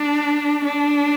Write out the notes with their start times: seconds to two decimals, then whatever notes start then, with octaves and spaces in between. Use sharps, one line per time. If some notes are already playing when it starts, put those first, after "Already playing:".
Already playing: D4
0.65 D4